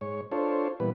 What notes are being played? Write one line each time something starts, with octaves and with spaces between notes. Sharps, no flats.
G#2 C#5
D4 F4 A4 C5 C#5
A#2 E3 G3 B3 B4